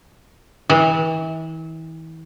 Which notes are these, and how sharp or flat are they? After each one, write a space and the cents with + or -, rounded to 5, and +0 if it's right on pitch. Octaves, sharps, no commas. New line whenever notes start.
E3 -35